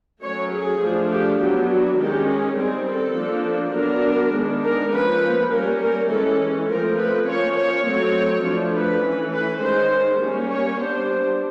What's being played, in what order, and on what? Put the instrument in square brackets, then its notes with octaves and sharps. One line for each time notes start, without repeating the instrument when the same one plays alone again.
[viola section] F#3 A3 C#4 C#5
G#4
F3 A3 D4
G4
F#3 B3 D4 G4
F#4
D#3 G#3 C#4 G4
G#4
D#3 G3 C4 G#4
A4
F3 A#3 D4
F#3 B3 D4 A#4
D#3 G#3 B3 D4
A#4
F3 A#3 C#4 B4
G3 A#3 C#4 A#4
A#4
E3 G#3 C#4 A4
F3 A3 C4 A#4
B4
F3 A#3 C#4 C#5
C#5
F#3 A3 C4 C#5
F3 A3 D4
B4
E3 A3 C#4
B4
D#3 G#3 C#4 C5
G3 A#3 C#4
C#5
G3 B3 D4 C5